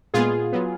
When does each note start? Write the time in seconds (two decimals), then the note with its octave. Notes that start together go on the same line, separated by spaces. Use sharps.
0.14 A#2 G#3 B3 F4 G#4
0.52 F#3 B3